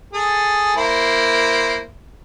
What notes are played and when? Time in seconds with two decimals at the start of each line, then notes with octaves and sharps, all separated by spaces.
0.13 G#4 A4
0.76 A#3 E4 C5